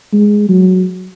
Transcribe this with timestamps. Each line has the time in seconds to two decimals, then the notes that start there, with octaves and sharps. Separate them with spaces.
0.12 G#3
0.49 F#3